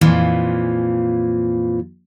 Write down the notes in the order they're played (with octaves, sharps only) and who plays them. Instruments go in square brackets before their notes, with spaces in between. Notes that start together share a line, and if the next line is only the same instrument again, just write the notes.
[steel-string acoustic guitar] F2 A#2 E3 F3